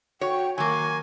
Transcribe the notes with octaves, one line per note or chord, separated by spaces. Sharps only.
F#4 C#5 G5
D#3 F#3 A#3 G#5 C#6